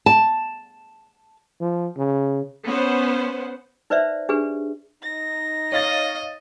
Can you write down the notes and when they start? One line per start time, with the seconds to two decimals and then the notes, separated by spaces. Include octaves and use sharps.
0.06 A5
1.61 F3
1.97 C#3
2.66 B3 C#4 B4 C5 F#5
3.90 D#4 B4 C5 D5 E5
4.29 D4 G4 G#4 B4
5.03 D#4 A#6
5.72 C#5 D#5 F5 A6